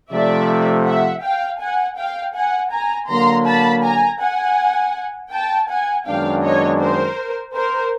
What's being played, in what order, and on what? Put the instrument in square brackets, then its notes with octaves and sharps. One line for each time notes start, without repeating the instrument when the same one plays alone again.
[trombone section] C3 F3 A3 [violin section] D5 E5
[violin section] E5 F#5
F5 G5
F#5 G#5
F5 G5
F#5 G#5
G#5 A#5
[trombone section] D3 F#3 A#3 [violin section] A#5 C6
[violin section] A5 B5
G#5 A#5
F#5 G#5
G5 A5
F#5 G#5
[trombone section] F#2 D#3 G#3 B3 D4 [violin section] F5 G5
[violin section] C#5 D#5
A#4 C5
A#4 C5